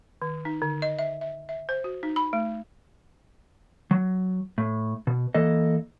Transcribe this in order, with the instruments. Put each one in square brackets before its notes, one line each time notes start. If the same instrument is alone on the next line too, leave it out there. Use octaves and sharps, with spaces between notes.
[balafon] D#3
D#4
D3
D#5
E5
E5
E5
C5
F#4
D#4
B5
A3
[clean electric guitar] F#3
A2
B2
E3 A#3 A4 D#5